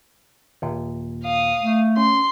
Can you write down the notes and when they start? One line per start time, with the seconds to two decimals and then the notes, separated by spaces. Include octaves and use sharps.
0.62 D#2 A#2
1.24 F5 D#6
1.61 A3
1.97 C#4 C6